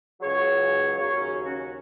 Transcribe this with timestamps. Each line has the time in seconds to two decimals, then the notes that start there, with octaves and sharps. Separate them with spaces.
0.21 C#2 C#3 F#3 G#4 C#5
0.97 D#2 C#3 F#3 G#4 C#5
1.16 C#4
1.44 C#4 F#4